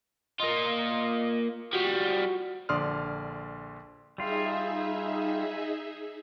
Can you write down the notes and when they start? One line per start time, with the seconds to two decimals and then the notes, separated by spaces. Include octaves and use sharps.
0.40 A#3 F4 D#5
1.73 F3 G3 F#4
2.69 A#1 D3 D5 C6 D#6 F6
4.18 G3 D#4 F4 G#4 E5